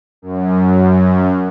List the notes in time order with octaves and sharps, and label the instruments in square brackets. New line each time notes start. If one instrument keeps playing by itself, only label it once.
[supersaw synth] F#2